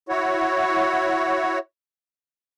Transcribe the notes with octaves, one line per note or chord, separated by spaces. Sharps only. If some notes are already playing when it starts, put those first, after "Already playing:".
E4 F#4 C#5